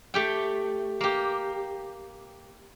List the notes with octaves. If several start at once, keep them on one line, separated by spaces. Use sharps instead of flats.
A3 G4 G5
A#3 G4